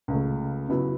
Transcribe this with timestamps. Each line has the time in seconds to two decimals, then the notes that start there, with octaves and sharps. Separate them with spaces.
0.08 C#2 C#3 A3
0.68 C#3 F#3 B3 E4